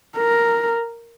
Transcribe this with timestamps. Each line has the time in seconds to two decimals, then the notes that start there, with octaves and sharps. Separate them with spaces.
0.17 A#4